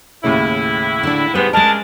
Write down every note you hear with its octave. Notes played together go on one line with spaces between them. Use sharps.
D#2 A2 C#3 E4
D3 D4
G#2 G3 B3 B4
C#3 G#3 D4 A#4 D#5 A5